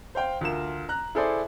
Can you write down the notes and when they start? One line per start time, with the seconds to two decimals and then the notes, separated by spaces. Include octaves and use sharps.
0.15 C5 F5 G5
0.41 D2 F4 A#4 E7
0.89 A#5 F#6
1.15 E4 G#4 A4 C5 D5